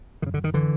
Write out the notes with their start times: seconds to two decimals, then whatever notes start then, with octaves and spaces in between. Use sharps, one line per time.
0.22 F#2 D#3
0.26 C#3
0.34 D3
0.44 D#3
0.54 D3 E3